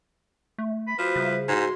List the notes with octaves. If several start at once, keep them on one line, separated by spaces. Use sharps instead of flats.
A3
B5
F3 F#4 B4 C5 B5
C#3 G3 C5 E5
G#2 F#4 C6